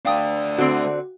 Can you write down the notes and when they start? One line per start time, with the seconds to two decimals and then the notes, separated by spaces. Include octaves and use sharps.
0.05 A3 D4 F5 G5 D#6
0.59 D3 C4 F#4 D5